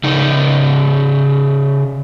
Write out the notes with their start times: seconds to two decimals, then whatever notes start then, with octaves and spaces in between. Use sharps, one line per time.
0.04 C#3 D#4